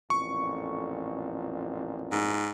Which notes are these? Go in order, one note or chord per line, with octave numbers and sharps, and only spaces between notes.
A1 F2 A#2 C#6
G#2